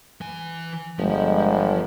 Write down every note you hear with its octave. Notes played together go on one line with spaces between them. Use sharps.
E3 G#5
G1 F3 G#3